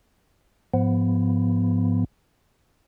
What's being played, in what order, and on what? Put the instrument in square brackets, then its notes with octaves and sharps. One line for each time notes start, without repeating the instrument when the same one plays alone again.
[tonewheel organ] G#2 F3 B3